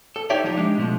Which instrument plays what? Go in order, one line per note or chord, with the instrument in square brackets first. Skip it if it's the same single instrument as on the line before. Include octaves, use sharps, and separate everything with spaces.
[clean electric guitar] A4
D#4 G4 C#5 D5 E5
F3 D#4 G4
G#3 D4 G4
B2 F3 A3